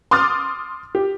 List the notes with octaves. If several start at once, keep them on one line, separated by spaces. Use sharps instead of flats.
C6 D6 D#6 F6 A6
G4